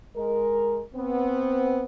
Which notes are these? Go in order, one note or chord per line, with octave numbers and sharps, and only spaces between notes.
G#3 A#4
B3 C4